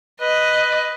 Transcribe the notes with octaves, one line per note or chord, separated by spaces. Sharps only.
B4 D#5